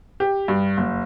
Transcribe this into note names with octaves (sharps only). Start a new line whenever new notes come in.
G4
G2
F#1